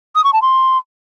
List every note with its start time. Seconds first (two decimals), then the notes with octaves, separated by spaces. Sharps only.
0.15 D#6
0.24 C#6
0.33 A5
0.42 C6